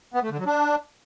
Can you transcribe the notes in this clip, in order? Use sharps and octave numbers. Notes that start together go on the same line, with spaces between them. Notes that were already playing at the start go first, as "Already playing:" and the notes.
B3
A3
D3
F#3
D4